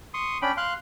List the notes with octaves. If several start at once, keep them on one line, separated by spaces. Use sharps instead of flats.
C6 C#6 D#6
C#4 D4 G5 B5
F5 C6 F#6